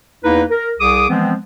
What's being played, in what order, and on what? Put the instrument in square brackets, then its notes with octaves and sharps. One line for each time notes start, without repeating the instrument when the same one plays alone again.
[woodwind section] E2 A#3 D#4 E4 B4
A#4
C2 G#4 D6 D#6
E3 F3 G#3 B3 C4